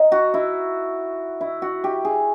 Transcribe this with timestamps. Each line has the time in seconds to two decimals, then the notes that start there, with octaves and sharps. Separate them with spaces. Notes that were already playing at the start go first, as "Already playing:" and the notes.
Already playing: D#4
0.12 F#4
0.34 E4
1.41 E4
1.62 F#4
1.84 G4
2.05 G#4